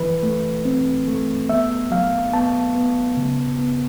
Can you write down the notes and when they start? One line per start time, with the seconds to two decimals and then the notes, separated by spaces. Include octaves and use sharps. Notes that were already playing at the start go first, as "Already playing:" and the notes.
Already playing: E3 B4
0.23 A3
0.65 C4
1.08 A3
1.49 B3 E5
1.91 F#3 F5
2.33 B3 A5
2.75 B3
3.17 C#3
3.59 B3